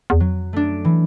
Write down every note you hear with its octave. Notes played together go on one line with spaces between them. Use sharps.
E2
F2 F#3
F#2 A3 D4
E3